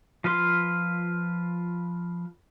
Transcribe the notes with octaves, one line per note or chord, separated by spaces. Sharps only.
F3 F4 B4 F5 C6